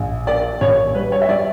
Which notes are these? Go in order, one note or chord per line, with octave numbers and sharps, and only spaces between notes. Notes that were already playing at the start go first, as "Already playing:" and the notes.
Already playing: A#1
A#3 D5
A#1 C#5
G3 B4
C#5
E5
G3 D5